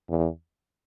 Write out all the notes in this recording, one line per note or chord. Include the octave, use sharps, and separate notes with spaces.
E2